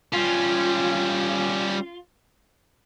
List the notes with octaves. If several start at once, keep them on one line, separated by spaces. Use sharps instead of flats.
G3 C#4 F4